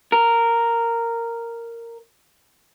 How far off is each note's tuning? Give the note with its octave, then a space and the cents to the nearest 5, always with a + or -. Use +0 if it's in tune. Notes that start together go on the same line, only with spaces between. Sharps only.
A#4 -5